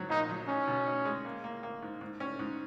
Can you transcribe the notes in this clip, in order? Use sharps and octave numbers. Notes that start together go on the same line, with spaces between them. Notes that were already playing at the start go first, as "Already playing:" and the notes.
Already playing: G#2 F#3
A#1 D#4
F#3
C#4 D#4
B2
D#4
G#3
A#3
A#3
A#3
G#2
G#2
C#4
G#2